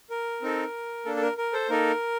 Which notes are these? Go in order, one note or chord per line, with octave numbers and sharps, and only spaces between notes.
A#4
C4 D#4 A4
A#3 D4 A4
A4
A#4
A#4
A4 C5
A#3 D#4 A4 A#4